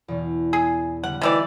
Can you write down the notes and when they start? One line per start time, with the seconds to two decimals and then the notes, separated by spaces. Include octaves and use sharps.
0.08 E2 B2
0.53 G#4
1.04 D3 G3 F#5
1.21 D#3 E3 A3 F#4 D5